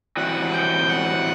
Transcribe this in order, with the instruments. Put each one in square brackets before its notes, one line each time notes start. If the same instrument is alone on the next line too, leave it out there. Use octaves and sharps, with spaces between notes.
[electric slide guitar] A2 E3 G3 C4 F#4 [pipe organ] F#5
[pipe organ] G5
F#5